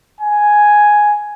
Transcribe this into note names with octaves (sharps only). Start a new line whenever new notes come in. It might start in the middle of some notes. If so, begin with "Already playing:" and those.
G#5